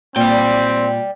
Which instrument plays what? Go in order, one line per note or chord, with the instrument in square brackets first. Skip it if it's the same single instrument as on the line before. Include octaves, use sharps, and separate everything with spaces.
[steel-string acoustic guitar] A#2 [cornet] C4 [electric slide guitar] D5 G5